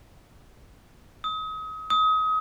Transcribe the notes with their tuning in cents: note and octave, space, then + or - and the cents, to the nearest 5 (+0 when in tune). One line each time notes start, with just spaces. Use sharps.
D#6 +35
D#6 +30